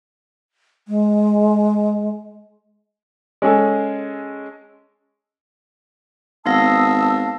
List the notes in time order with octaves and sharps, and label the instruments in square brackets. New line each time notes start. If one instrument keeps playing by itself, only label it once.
[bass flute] G#3
[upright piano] G#3 C#4 G#4 A4
[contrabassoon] G#1 [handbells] B3 F5 A#6 [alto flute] A5 [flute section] D#6 E6